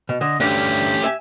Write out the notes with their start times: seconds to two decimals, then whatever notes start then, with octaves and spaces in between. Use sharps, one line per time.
0.09 B2
0.21 D3 D#5
0.40 D2 G2 A3 C#4 D4 G4
1.04 E5 G#5